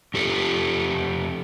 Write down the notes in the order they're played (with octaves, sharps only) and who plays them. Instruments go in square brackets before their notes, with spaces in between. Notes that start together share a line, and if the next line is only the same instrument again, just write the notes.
[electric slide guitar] F2 G4 A4